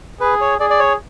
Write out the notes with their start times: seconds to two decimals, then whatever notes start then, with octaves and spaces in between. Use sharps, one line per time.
0.20 G#4 B4
0.41 C#5
0.60 G#4 D5
0.70 D5
0.79 C#5